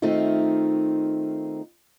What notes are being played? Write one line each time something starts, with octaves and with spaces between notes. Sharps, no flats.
D#3 A3 C4 D#4 F4